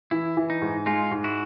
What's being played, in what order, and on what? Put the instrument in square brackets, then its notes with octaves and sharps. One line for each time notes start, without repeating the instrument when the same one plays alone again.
[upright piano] E3 [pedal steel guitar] E4
[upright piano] E3
[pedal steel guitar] D#4
[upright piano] G#2
[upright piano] G#3 [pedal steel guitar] D#4 F4
[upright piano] G#2
[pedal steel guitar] E4 F#4